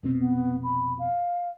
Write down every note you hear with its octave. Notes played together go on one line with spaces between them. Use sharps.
F1 B2 C4
B3
B5
F5